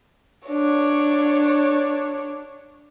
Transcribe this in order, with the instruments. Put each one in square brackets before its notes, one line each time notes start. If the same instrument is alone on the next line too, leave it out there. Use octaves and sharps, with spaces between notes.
[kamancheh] D4 C#5